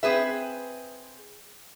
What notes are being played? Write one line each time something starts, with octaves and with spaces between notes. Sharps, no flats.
C4 G#4 B4 E5